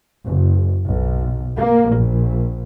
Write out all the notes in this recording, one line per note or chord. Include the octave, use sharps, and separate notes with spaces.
F#1
B1
A#3
A#1